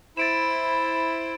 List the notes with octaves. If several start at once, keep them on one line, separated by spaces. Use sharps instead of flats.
E4 C5 B5 A6 D7 E7